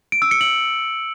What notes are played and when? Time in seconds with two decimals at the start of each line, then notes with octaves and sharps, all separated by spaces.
0.12 D7
0.22 E6
0.31 C#7
0.41 F#7